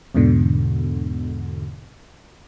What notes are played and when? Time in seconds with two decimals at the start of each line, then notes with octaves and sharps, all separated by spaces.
0.15 E2 G#2 B2 D3